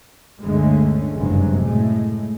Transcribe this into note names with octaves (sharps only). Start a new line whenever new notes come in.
G1 D2 D3 G#3 A3 C#4
F#1 G2 C3 F#3 G#3
A2 G#3 A3